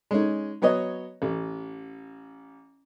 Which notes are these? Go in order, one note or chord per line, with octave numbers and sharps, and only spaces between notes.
G#3 C#4 D#4
F#3 B3 C#5 D#5
A1